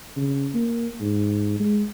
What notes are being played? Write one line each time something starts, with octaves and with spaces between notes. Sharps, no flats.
C#3
A#3
G#2
G#3